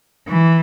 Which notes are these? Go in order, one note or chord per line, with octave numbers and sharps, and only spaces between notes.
E3